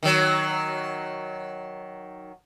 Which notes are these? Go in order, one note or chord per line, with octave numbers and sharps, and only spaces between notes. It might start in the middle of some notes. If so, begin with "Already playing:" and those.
D#3 F#3